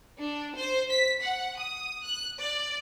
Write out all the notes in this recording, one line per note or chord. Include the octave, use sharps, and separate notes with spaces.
D4
C5
B6
F#5
D#6
F#6
D5